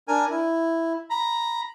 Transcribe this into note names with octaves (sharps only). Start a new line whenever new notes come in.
D4 A#4 G#5
E4
A#5 B5